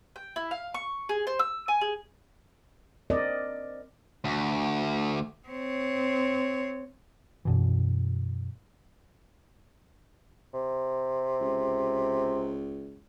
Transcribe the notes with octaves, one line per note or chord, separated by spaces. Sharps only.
G5
E4
F5
C#6
G#4
C5
E6
G#5
G#4
C4 A#4 D5 D#5
D2
C4 C#5
F#2 B2 E3
C3
C#2